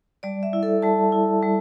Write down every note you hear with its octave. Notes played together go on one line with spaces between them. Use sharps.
G3 D5
E5
E4
A4
G3 A5
E4
G3